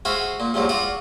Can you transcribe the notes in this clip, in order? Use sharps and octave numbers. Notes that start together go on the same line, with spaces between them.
F#4 G#4 C5 E5 F5
A#2
E2 G2 A#2 F3 F#3
F4 F#4 D5 F5